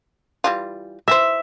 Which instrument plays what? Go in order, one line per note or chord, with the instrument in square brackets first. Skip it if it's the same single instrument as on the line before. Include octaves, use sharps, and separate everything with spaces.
[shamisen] E3 G3 F4
[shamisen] E3 G4 C5 [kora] E5